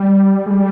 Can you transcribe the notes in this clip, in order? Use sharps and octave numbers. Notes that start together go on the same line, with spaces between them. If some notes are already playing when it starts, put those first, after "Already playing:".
Already playing: G3
G#3
G3